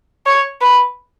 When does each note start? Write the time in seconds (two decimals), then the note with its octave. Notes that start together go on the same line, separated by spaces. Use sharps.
0.26 C#5
0.61 B4